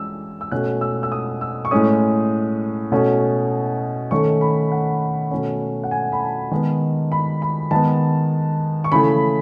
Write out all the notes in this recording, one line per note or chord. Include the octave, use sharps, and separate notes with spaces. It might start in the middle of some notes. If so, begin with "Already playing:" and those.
Already playing: E3 G#3 C#4 E6
E6
B2 A3 C#4 F#6
E6
E6
D#6
E6
C#6
A2 G#3 C#4 D#6
B2 A3 C#4
D#3 A3 C#4 C#6
B5
F#5
B2 A3 C#4
F#5
G#5
B5
A5
D#3 G#3 B3
B5
B5
D#3 G#3 B3 A5
C#6
C#3 E3 A3 B5